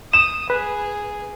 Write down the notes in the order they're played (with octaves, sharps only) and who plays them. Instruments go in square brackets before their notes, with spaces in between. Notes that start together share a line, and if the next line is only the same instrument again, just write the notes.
[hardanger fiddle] D#6 [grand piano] E7
[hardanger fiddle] G#4 [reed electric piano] B4